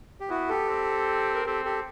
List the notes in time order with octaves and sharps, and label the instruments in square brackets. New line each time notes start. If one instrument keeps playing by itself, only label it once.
[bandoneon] G4
[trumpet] B3 [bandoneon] E4 F#4
[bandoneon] G4 A4
[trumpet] C4
[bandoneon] A#4
[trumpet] C4 [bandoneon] G4 A4
[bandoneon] G4 A4